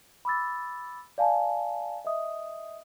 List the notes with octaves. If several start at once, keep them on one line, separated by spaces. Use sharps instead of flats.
B5 D6 E6 A6
D5 F5 G#5 A5
D#5 E5 D#6